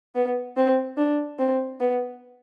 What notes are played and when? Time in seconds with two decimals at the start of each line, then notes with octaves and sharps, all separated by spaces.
0.15 B3
0.57 C4
0.97 D4
1.39 C4
1.80 B3